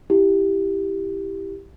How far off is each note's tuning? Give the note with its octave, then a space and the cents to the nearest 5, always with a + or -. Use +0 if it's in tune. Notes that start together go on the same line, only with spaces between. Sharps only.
E4 +0 G4 +0